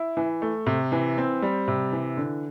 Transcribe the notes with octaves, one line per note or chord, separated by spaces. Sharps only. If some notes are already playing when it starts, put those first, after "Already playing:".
Already playing: E4
E3
A3
C3
E3
C4
G3
C3
E3
D3